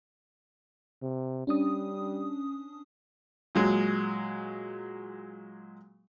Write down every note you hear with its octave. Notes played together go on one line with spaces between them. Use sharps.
C3
G3 C#4 D4 D#6
A#2 F#3 G#3